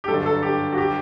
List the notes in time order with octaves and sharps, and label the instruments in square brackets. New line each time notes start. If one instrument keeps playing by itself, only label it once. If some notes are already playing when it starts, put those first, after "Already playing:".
[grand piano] G4
[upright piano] G1 F#2 D3 [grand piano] A4
[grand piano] A4
G4
F#4
G4